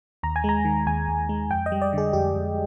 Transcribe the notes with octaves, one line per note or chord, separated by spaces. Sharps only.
D#2 A#5
G#5
G#3 A#5
D#3
D#2 G#5
D#2
G#3
F2 G5
D#5
G3
D5
D3 G#4
F2 G4
F2